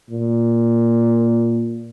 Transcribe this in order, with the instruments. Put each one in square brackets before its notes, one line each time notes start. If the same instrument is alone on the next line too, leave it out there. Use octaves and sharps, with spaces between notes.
[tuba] A#2